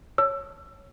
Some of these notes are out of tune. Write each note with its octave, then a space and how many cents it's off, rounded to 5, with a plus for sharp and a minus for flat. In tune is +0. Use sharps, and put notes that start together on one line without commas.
C#5 -5 A5 +0 E6 +25